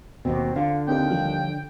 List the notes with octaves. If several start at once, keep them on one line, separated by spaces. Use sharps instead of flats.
D#2 B2 C4
D3 F4
D#2 C4 D#4 G4 G5
F3 G3 F4